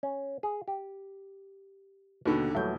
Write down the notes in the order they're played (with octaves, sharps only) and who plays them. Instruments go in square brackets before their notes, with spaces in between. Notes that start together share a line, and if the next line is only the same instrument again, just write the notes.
[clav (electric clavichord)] C#4
G#4
G4
[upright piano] D#2 D3 [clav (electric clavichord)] B2
[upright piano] D#1 G6 [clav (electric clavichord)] E3 F#3 A3